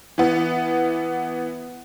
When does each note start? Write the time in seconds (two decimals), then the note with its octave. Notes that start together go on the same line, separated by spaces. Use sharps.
0.18 E3 B3